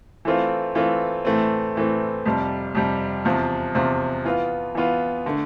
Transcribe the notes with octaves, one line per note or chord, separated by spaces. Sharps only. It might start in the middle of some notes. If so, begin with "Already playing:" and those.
E3 A3 C4 F4
E3 A3 C4 F4
A2 E3 A3 C4
A2 E3 A3 C4
F2 C3 G3
F2 C3 G3
E2 C3 F3
E2 C3 F3
E3 B3 F4
E3 B3 F4
D3 A3